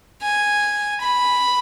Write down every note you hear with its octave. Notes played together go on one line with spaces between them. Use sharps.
G#5
B5